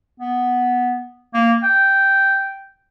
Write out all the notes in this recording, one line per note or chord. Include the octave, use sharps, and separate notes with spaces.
B3
A#3
G5